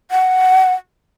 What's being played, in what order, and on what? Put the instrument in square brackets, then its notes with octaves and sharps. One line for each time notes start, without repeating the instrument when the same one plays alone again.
[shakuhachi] F#5